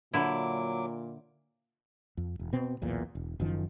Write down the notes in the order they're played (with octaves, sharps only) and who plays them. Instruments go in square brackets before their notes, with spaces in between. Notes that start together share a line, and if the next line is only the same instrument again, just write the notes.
[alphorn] A#2 [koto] D3 E4 [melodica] F#3 D6
[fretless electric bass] F2
E1
B2 C4
B1 E2 A#2
E1
F#1 F#2 D#3 F3